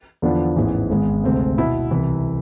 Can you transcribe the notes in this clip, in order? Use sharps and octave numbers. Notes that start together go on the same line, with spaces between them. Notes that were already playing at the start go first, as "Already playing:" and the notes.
E2 D3 F3 B3 D4
A1 G#2 E3 G#3 B3
G#1 G#2 G#3 B3
D2 C3 G#3 C4
B2 B3 E4
C2 C3 E3